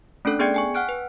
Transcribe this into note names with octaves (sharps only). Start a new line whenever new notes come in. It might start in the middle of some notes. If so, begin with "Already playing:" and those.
A3 C#4 D4 A4 F#6
B3 G#4 D5 G5 G#6 C#7
G5 G#5 C#6
F#5 G5 F6 F#6 D7
B4